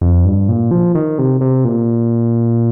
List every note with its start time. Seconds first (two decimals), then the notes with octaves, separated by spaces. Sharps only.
0.01 F2
0.25 G2
0.49 A#2
0.71 F3
0.95 D#3
1.19 C3
1.41 C3
1.65 A#2